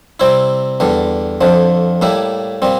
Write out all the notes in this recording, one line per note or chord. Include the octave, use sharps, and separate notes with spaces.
C3 G3 C4 E4
E2 D3 G3
F2 D3 F3
A2 G3 A#3 E4
A#2 G3 C4